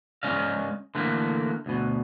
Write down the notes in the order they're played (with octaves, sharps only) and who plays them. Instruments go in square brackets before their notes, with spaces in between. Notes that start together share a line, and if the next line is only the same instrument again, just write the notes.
[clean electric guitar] G#3 C#4 D5 D#5 F5
D3 E3 A3 A#3
D2 B2